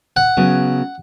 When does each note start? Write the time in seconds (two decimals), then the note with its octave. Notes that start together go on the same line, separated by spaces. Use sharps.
0.17 F#5
0.37 C#3 F#3 B3